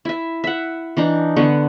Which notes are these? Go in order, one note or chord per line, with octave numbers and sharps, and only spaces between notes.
E4 E5
E5 F#5
E3 D4 D#4
D3 B3 C#6